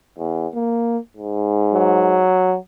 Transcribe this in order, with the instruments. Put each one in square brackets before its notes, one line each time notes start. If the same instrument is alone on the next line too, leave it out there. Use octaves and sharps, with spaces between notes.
[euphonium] E2
A#3
G#2
[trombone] F#3